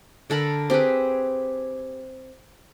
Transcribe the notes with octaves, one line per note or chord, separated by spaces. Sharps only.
D3 A4 A#4 B5
C4 G4 G#4 B4